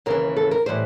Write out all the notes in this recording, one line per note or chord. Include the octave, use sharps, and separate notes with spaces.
D#2 C#3 E3 A#4
A4
A#4
A2 E3 G3 C5